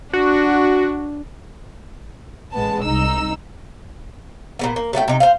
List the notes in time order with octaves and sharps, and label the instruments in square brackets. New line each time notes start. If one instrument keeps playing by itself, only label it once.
[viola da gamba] D4 [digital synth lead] F#4
[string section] A1 G#3 B3 A5
C2 D#4 E6
[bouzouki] A#2 C#3 B3
A#3
F#3 A3 A4 G5
C3 D#4
C5 F5